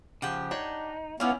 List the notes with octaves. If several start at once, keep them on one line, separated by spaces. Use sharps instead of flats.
C#3 F3 G4 F#5 G5
D4 D#4 C#5
B3 C#4 D#4 E4 D5 F5